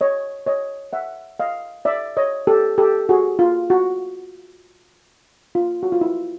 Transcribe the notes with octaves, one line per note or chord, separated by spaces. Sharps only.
C#5 D#5
C#5 D#5
E5 F#5
D#5 F5
D5 E5
C#5 D#5
G4 A4
G4 A4
F#4 G#4
F4
F#4
F4
F#4
F4
E4